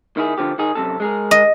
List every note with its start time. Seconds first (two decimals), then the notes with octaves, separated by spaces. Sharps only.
0.17 D#3 E4 G#4
0.38 D3 F3 G4
0.58 D#3 D#4 G#4
0.75 F#2 C3 A4
1.00 G#3 G#4 A#4
1.31 D#5